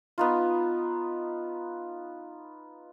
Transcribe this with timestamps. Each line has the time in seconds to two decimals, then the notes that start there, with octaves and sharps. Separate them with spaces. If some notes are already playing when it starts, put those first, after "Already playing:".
0.18 B3 D#4 F4